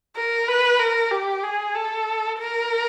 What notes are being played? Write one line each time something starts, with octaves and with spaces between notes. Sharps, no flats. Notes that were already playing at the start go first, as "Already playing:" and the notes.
A#4
B4
A#4
G4
G#4
A4
A#4